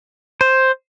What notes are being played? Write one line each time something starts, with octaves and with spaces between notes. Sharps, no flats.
C5